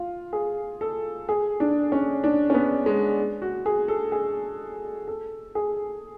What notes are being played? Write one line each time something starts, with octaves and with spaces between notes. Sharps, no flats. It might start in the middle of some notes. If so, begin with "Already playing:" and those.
Already playing: F4
G#4
A4
G#4
D4
C#4
D4
C#4
B3
G#3
F#4
G#4
A4
G#4
A4
G#4